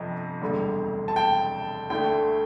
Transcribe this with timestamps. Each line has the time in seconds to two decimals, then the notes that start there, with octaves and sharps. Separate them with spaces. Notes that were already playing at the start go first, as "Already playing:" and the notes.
Already playing: G1 F2 C3 F3
0.42 E1 D2 D3 G3
1.08 A5
1.16 G5
1.90 D2 D3 A3 G5